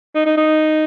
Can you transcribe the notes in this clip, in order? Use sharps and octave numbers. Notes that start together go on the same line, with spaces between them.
D#4
D#4
D#4